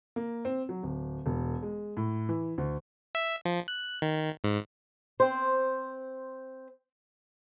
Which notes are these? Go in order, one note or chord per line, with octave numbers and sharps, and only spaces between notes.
A#3
C4
F#3
D1
E1
G#3
A2
E3
D2
E5
F3
F#6
D#3
G#2
C4 C5